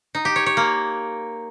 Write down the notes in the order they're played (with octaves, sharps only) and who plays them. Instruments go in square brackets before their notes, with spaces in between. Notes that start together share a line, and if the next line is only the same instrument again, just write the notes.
[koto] D#4
G4
C#5
C#5
A#3